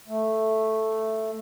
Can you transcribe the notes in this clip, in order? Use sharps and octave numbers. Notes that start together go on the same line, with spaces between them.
A3